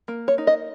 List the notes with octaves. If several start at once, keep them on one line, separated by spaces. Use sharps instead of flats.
A#3
C#5
D#4
D#5